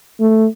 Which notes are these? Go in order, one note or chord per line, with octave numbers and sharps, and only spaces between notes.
A3